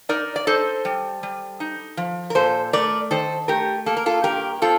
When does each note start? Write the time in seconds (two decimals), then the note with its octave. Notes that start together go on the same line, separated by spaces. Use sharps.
0.09 D#4 A#4 D5
0.36 D5
0.47 D#4 A4 C5
0.85 G3
1.23 G3
1.60 D#4
1.97 F3
2.30 A#4
2.35 A#2 A4 C5
2.73 A3 A#4 D5
3.11 D#3 A4 C5
3.48 A3 G4 A#4
3.86 A#3 A4
3.97 A#4
4.06 F4 A4
4.24 G2 G4 A#4
4.62 C4 F4 A4